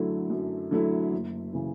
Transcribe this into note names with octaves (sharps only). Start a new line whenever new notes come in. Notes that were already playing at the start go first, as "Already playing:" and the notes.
Already playing: F#2 D3 F#3 A3 E4
F#2
D3 F#3 A3 E4
F#1
C#3 E3